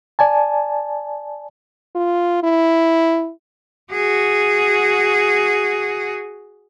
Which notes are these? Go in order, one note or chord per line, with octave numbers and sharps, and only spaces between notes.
D5 G#5 A5
F4
E4
F#4 G#4